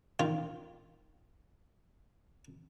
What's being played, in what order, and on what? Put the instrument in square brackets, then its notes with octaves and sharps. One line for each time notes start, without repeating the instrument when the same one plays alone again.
[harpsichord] D#3 F4